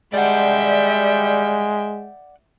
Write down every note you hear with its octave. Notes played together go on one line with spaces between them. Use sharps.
G3 G#3 D5 E5 F#5 G5